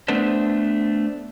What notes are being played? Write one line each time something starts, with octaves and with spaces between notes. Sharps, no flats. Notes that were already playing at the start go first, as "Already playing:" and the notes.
A3 B3 D4 A4 B4 C5